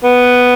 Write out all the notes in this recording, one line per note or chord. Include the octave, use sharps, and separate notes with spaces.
B3